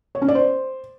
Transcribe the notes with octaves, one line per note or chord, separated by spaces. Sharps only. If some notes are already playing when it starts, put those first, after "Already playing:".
C#5
C#4
D5
C5